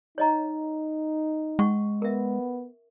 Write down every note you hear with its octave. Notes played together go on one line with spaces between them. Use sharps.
D#4 C#5 D#5 A#5
G#3 C#4 F#5 C#6
B3 A#4 E5